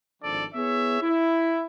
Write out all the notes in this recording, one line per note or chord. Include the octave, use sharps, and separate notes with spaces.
G#1 F3 D4 A4 D5
B3 E4 G#4 C#5 E5
E4